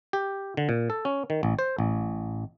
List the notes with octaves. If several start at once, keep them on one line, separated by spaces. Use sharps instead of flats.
G4
D3
A#2
A4
C#4
D#3
A1
C5
A1